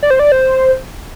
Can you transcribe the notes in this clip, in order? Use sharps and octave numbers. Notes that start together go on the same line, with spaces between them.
D5
C5
D5
C5